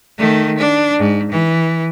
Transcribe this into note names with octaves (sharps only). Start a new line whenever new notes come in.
D#3 A3
D4
G#2
E3